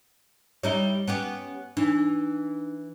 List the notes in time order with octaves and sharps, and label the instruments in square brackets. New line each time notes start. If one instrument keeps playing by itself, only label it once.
[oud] G3 D#4 E4 [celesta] C#5 G7
[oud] B3 C#4 G4
[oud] E3 [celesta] D4 D#4